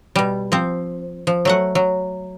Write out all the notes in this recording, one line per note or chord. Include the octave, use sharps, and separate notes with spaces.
B2 G3
F3 C4
F3
F#3 A3 F#5
F#3